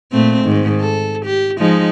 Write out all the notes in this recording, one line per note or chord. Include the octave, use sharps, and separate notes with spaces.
A#2 A3 C4
G#2 D#3
A4
G4
F3 G#3 D#4